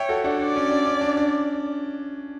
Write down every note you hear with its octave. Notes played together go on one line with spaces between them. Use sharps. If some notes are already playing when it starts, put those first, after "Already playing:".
Already playing: C#5 E5 G5
F#4 A4
D4 F#4
D4 D5
C#4
D4
C#4
D4
D4